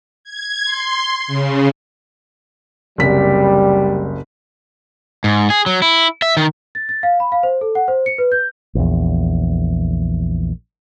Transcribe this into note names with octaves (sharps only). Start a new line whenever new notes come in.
G#6
C6
C#3
F#1 C2 G3 B6
G#2
G#4
F#3
E4
E5
D#3
A6
A6
F5
B5
F5
C5
A4
F#5
C5
C#7
B4
G6
A#1 E2